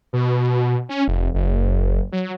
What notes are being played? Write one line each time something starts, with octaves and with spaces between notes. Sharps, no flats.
B2
C#4
F1
F#1
F#3